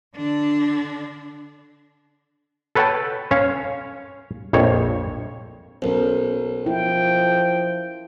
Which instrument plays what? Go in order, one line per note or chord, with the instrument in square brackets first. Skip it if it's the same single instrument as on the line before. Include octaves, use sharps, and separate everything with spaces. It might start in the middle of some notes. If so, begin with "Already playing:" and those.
[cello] D3 D4
[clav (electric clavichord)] A4 B4 C#5 F#5 G5 A5
C#4 C#5 F5
A#1 F2 C#5
[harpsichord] B1 [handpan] C#4 A#4 C5
[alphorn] F3 [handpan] E4 [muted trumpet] G5